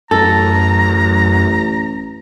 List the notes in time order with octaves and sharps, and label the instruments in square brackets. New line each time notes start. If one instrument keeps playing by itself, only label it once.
[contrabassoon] A1 [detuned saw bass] F#2 [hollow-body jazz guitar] A4 [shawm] A#5